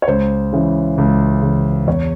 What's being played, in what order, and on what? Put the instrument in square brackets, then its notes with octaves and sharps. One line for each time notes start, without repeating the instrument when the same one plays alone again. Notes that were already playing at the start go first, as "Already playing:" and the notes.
[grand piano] C#5
C#2 C5
C#3 E3
C#2
C#3 E3
E2 C#5